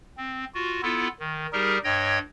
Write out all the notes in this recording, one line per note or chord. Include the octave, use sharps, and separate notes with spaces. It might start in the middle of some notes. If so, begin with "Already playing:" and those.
C4
F4 F#4
B3 E4 F4 A4
D#3
G3 D#4 G4 G#4 A#4
G2 C#5 D#5 G5 G#6